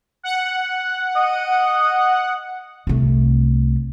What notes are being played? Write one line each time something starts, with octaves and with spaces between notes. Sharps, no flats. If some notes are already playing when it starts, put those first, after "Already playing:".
F#5
D#5
C2 A3